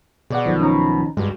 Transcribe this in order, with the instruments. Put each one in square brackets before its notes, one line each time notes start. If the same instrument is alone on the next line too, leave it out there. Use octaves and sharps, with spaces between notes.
[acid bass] B2 [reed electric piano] G#4 D5 F#5
[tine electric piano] B1 D#3 F3
[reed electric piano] C#4 D#4 A#5
[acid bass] G2 [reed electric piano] G#3 F#4